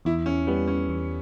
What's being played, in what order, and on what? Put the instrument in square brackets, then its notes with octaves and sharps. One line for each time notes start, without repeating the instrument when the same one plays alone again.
[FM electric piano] E2 [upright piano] E4
[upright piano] C#4
[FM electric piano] G3 [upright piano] B3
[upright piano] C#4
[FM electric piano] E2